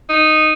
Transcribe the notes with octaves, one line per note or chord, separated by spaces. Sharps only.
D#4